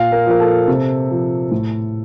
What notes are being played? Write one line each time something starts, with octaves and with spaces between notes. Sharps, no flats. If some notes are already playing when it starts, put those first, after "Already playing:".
Already playing: A#2 F5
A#4
F3 A#4
A4
C3
F3
A2